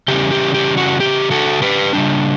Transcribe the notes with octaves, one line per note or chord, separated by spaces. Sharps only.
C#3 E3 G3 C#4 G4
G4
G4
F#4
G4
F#4 A4
G4 B4
C#3 G3 D4